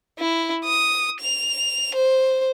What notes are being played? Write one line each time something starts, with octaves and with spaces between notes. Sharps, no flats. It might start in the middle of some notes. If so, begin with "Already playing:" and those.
E4
D#6
F7
C5